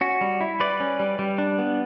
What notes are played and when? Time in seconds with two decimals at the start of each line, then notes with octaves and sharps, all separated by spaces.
0.01 C#4 F#4
0.21 G3
0.41 E4
0.60 G3 B4 D5
0.80 C#4
1.00 G3
1.19 G3
1.38 D4
1.58 B3